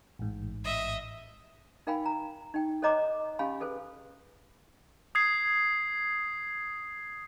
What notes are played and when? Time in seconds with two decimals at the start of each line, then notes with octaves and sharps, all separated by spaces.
0.19 A1 G#2
0.64 D#5 E5
1.87 D#4 A#4 F5 G5 G#5 B5
2.06 A#5
2.54 D#4 G5
2.82 A4 C5 C#5 D#5 A#5 D6
3.39 C#4 G4 F5 G#5 B5
3.60 G#4 A4 B4 C5
5.15 D#6 G#6 C7